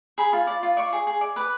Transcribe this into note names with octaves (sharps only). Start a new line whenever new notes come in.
G#4 B5
F4
D5
F4
D5 C#6
G#4
G#4
D5
B4 D6